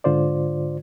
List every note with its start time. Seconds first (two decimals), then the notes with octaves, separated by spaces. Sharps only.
0.04 G#2 D3 F4 C5 D5